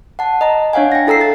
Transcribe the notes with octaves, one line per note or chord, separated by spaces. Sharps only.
F#5 A5
D#5 A#5
D4 C#5 F5 F#5 G#5
G5 A#6
E4 A4 A#5 E6 C7
A6